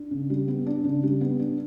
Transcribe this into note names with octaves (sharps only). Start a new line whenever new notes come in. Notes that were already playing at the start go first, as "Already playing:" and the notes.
Already playing: D4
C#3
G3
B3
D4
C#3
G3
B3
D4